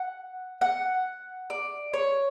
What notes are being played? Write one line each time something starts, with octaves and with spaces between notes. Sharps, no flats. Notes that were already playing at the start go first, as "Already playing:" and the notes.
Already playing: F#5
F#5
D5
C#5